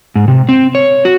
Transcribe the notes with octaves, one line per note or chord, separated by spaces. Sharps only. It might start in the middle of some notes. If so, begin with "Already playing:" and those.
G#2
C3
C4
C#5
F#4